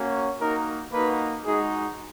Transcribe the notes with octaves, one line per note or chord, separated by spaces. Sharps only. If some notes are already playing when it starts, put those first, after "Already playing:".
Already playing: A#3 C#4 F#4
A#3 D#4 F#4 A#4
A#3 D#4 F#4 B4
G#3 D#4 F#4 G#4